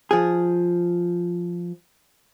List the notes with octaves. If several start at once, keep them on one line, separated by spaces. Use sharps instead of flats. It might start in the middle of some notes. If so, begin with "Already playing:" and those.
F3 G#4